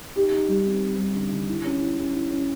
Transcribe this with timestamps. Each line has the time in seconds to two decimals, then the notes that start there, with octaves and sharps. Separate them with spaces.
0.16 D#4 G4
0.32 D#4
0.48 G3
0.65 C4
0.82 C4
0.98 G3
1.16 D3
1.31 D3
1.49 E4
1.65 C#4
1.81 E4
1.99 C#4
2.15 E4
2.31 C#4